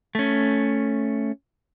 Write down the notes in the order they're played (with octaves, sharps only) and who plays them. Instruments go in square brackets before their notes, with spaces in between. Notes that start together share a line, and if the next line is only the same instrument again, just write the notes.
[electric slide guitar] A3 C#4